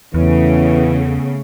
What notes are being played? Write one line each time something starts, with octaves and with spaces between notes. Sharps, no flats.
E2 C#3 E3 A3 B3